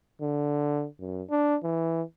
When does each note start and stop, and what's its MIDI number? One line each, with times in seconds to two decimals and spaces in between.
0.22 0.87 50
1.00 1.23 42
1.30 1.56 62
1.63 2.02 52